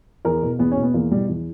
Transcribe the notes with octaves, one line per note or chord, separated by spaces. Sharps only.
E2 A#4
B2
E2 B3
C#4
B2
B3
E2 A#3
B2 G3
E2